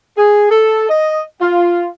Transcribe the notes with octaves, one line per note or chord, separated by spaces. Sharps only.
G#4
A4
D#5
F4